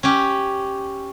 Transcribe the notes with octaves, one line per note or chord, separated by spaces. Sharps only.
C#4 G4